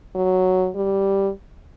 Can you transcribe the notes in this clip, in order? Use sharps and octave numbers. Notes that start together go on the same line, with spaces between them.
F#3
G3